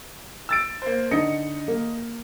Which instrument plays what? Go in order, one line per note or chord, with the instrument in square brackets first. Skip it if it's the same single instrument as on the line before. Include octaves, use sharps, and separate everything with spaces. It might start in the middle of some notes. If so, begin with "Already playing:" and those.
[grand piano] E6 A6 D7
A#3 C5
[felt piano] D3 D#4 C#7 [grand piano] D#5
[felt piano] A#3